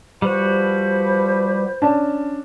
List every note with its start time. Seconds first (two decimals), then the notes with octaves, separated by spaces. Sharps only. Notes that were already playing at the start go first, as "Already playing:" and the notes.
0.22 F3 G3 F#4 B4 C5
1.82 C#4 D4 A5